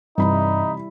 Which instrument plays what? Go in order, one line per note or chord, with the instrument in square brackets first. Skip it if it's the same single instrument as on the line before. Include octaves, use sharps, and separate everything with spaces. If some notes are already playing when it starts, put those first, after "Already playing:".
[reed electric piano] G2 [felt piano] C3 E3 B5 [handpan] G3 E4 [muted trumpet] D#4